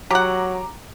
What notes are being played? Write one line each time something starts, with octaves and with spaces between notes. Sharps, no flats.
F#3 G4 F#5 A#5 D6